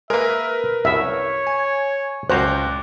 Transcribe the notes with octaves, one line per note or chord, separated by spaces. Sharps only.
G#3 A#3 A#4 B4 E5
C2 F#2 B3 C#5 E5
G#5
C#2 F#2 F#4 C5 D5 A#5 F#6